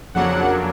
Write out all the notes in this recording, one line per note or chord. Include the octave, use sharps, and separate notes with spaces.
F2 C#3 F#3 A#3 D4 F#5